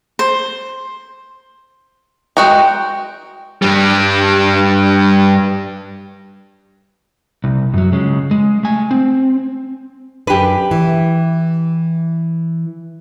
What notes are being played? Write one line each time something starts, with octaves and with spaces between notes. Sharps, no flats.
C5
G#3 F#4 G5 A#5
G2 G3
C2
F#2 F#3
C#3 G#3
G#3
A3 G#5
C4
F#2 D4 G4 B4
E3